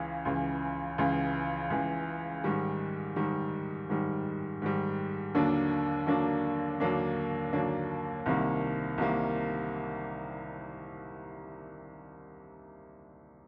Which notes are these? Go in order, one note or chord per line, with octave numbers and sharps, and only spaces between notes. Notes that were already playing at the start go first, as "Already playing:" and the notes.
Already playing: C#2 C#3 E3
C#2 C#3 E3
C#2 C#3 E3
C#2 C#3 E3
G#2 D#3 G3
G#2 D#3 G3
G#2 D#3 G3
G#2 D#3 G3
D#2 D3 F#3 A#3 D4
D#2 D3 F#3 A#3 D4
D#2 D3 F#3 A#3 D4
D#2 D3 F#3 A#3 D4
C2 C3 D#3 G3 A#3
C2 C3 D#3 G3 A#3